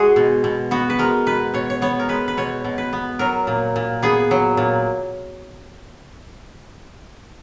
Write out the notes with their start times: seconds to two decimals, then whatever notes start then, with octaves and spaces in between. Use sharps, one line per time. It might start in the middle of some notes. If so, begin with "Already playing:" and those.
Already playing: G#3 C#4 F#4 G#4
0.16 B2
0.44 B2
0.71 B3 F#4
0.90 B4
0.99 G#3 A#4
1.26 B2 B4
1.54 B2 C#5
1.70 C#5
1.82 B3 C#5
1.99 A#4
2.09 G#3 B4
2.28 B4
2.37 B2 C#5
2.64 B2
2.78 B4
2.93 B3
3.19 F#3 A#4
3.47 A#2
3.76 A#2
4.02 B3 G#4
4.31 F#3
4.57 A#2